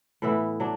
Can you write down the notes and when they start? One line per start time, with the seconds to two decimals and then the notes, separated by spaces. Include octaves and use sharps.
0.22 A2 E3 B3 E4
0.60 F#3 D4